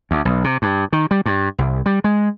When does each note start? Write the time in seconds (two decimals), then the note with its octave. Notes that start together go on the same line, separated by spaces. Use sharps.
0.11 D2
0.25 B1
0.44 C3
0.62 G2
0.93 D#3
1.11 G3
1.26 G2
1.58 C2
1.86 G3
2.04 G#3